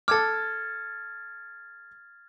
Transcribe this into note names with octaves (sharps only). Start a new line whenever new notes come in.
A4 D6 F6 G#6 A6